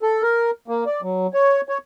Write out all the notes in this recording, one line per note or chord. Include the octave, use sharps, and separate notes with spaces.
A4
A#4
A#3
D5
F#3
C#5
C#5